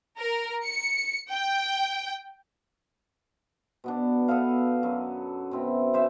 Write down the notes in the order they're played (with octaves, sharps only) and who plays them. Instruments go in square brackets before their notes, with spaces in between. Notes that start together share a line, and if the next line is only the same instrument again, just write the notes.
[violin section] A#4
C#7
G5
[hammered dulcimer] B2 B3 D4
B3 D4 A4 F5
F#2
B2 C4 E4
C#3 C5 E5 D6